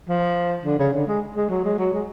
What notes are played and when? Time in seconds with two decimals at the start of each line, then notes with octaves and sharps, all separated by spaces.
0.08 F3
0.65 D3
0.79 C#3
0.93 D3
1.07 G#3
1.36 G#3
1.50 F#3
1.64 G#3
1.78 F#3
1.93 G#3